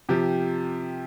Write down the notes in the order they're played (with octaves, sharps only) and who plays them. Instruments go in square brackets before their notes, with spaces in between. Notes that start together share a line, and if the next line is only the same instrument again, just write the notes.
[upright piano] C3 F3 G4